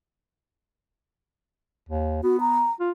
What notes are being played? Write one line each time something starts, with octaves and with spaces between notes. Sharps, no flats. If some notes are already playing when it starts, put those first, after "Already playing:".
D#2
B3 F#4
A#5
F4